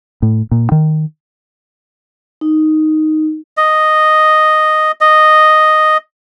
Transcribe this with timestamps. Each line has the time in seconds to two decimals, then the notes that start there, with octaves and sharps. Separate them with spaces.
0.22 A2
0.51 A#2
0.72 D#3
2.41 D#4
3.57 D#5
5.01 D#5